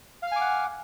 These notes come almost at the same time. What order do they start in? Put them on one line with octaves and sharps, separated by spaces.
F5 F6 G#5 D6 F#5